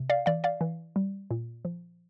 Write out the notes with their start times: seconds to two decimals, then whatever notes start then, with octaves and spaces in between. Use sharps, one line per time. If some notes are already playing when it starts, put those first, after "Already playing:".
Already playing: C3
0.10 D5 F5
0.26 E3 D5 F5
0.44 D5 F5
0.61 E3
0.96 G3
1.31 A#2
1.65 F3